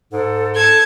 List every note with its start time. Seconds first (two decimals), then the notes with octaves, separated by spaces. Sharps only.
0.12 G#2 A4
0.55 A4 A5 G#6